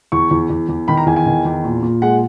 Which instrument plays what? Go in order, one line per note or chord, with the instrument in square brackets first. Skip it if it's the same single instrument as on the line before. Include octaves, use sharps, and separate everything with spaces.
[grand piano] E2 C#6
E2
E2
E2
D#3 B5
A#5
E2 G#5
G#5
D#3
E2
A#2
A#2
G#3 F#5